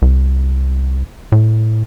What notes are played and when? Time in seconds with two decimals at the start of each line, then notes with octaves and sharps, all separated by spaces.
0.02 C2
1.32 A2